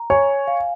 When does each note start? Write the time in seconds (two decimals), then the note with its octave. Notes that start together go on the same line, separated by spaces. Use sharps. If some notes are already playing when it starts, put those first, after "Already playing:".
Already playing: A#5
0.10 C#5 G#5
0.48 F5